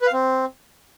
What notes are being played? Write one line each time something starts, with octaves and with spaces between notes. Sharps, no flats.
B4
F5
C4